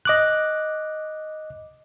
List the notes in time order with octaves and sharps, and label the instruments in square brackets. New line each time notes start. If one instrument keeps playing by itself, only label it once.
[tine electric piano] D#5 D6 F#6